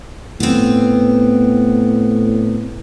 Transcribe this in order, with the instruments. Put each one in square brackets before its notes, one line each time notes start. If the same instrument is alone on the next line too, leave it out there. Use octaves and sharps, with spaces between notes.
[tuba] A2 [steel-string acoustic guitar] B3 C4